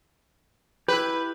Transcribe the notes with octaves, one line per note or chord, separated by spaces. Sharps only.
E4 G4 B4